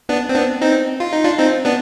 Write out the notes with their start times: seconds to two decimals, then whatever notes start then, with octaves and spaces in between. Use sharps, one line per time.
0.09 B3 D4
0.29 C4
0.35 B3 D4
0.61 C4 D#4
1.00 F4
1.13 D#4
1.24 D4 F4
1.39 C4 D#4
1.65 B3 D4